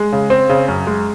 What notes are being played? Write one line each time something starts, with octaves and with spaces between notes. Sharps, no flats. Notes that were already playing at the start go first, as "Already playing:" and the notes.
Already playing: G#3
C#3
C4
C#3
F#2
G#3